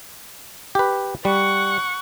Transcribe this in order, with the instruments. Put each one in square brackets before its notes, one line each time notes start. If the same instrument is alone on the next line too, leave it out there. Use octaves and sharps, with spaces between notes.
[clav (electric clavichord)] G4 B4
[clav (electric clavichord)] G3 [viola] F#5 C#6